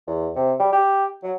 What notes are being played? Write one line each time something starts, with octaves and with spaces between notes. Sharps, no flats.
E2
C3
G3
G4
F#3